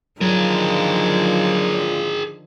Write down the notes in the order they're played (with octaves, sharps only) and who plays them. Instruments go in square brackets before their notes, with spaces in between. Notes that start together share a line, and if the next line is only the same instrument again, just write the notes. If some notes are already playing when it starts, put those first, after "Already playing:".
[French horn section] A#2 F4 [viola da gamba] D3 D#3 F3 [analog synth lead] F#3 [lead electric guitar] G#4 A#4